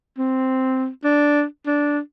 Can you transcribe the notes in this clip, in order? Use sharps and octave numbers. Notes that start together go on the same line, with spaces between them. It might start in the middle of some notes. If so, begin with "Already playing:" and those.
C4
D4
D4